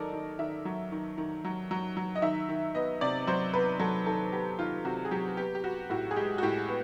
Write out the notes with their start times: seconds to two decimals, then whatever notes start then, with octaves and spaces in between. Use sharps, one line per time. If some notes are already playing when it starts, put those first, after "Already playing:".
Already playing: D#3 F#3 A4 A#4 D5 D#5
0.13 D#3
0.39 D#3 E5
0.65 F#3
0.92 D#3
1.18 D#3
1.45 F#3
1.71 F#3
1.97 F#3
2.15 D#5
2.22 D#3 E5
2.49 D#3
2.75 B3 D#5
3.01 C3 D5
3.27 F#3 C5
3.54 B3 B4
3.79 F#3 A4
4.06 D#3 A4
4.32 B3 G4
4.59 D#3 F4
4.85 C3 F#4
5.05 G#4
5.11 F#3 G4
5.37 B3 G4
5.55 G4
5.64 B3 F#4
5.90 A2 F#4
6.11 G#4
6.16 G#3 G4
6.38 F#4
6.43 A2 G4
6.68 B3